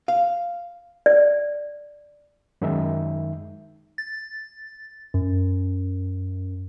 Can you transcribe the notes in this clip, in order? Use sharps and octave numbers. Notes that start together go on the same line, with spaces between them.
F5
D5
F#2 D#3 G#3 D#4 E5
A6
F#2